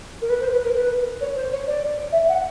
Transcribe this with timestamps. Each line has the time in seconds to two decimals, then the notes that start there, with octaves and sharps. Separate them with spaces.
0.21 A#4
0.29 B4
0.40 C5
0.51 B4
0.64 A#4
0.75 B4
1.21 C#5
1.35 C5
1.51 C#5
1.67 D5
2.12 E5
2.29 F#5